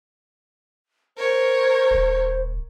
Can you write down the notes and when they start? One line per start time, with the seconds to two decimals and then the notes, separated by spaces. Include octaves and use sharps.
1.17 A#4 C5 C#5
1.91 D#1